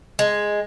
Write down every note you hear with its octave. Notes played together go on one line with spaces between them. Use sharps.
G#3